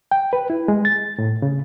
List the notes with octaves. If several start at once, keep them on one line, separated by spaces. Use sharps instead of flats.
G5
B4
E4
G#3
A6
A2
C#3